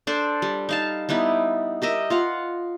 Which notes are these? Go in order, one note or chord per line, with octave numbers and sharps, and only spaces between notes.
D4 A4 C5 D5
G3
D#4 F5 A5
G3 B3 D#4 E4
G4 A#4 D#5 E5
F4 F5 F#5